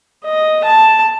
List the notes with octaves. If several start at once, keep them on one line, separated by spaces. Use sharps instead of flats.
D#5
A5